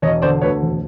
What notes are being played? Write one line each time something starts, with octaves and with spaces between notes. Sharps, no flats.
E1 C#5 D#5
D3 C5 D5
D2 B4 C#5
E1